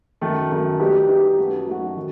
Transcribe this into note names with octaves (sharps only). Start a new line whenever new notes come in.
F#2 D#3 A3
F#2 D#3 A3
G3 D#4 G4 B4
G3 D#4 G4 B4
F#2 F#3 A3 D#4 F#4
F#2 F#3 A3 D#4 F#4
D#3